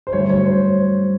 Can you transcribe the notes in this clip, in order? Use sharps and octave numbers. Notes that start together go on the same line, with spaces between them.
C5
G2 D3 F#3 A3 C#5
C#5
C5